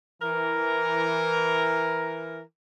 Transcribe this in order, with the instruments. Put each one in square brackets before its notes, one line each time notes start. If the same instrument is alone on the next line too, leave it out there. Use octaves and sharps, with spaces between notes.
[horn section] E3 A#4